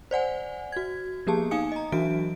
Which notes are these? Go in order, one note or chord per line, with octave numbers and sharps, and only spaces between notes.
C5 D5 F#5 G#5
F#4 G#6
F3 A#3 B3 G4 G#4 A5
D#4 F5 G#5 D#6 C#7
D#5 A#5
E3 F#3 D4 F#4 E5 D7